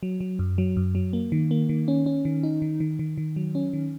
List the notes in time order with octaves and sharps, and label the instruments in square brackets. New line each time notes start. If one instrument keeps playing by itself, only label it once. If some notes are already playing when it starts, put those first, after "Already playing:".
[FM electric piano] F#3
F#3
F#2
F#3
F#2
F#3
A#3
D#3
A#3
D#3
C#4
C#4
D#3
D#4
D#3
D#3
D#3
D#3
F#3
C#4
D#3